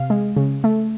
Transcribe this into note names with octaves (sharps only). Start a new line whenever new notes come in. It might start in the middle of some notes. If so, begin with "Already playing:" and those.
Already playing: C3 F5
G#3
C#3
A3